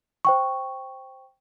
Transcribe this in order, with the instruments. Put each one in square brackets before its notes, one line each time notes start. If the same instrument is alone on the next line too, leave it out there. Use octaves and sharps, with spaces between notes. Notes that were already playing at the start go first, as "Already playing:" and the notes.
[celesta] C5 G5 C#6